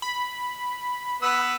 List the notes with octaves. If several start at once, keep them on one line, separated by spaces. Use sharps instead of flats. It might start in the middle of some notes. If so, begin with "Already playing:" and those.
B5
B3 B4 E6